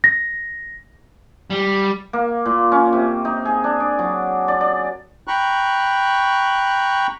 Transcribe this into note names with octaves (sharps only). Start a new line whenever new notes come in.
A#6
G3
A#3
A#2
C#4
C3
D#4
G#4
D4
D5
F#3
D5
D5
G5 A#5 B5 C#6 F#6